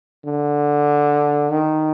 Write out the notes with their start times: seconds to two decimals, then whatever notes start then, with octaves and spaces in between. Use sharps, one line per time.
0.25 D3
1.50 D#3